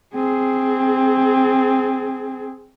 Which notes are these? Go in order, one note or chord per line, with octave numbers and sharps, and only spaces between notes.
C4 G#4